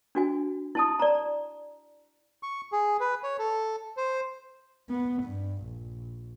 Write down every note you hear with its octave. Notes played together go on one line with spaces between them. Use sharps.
D4 F#4 G#5
E4 A5 D#6
D5 A#5
C#6
G#4
B4
C#5
A4
C5
B3
G2
A#1